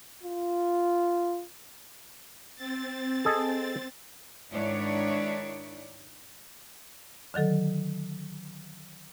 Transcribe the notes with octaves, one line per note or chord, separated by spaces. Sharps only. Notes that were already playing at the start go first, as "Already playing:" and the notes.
F4
C4 A6
G#4 A4 D#5
G#2 D#3 D4 E4 C#5 D5
D3 D#3 F#3 A4